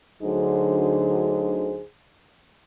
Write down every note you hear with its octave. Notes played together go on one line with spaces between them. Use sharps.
D2 D3 F#3 D#4 G#4 C5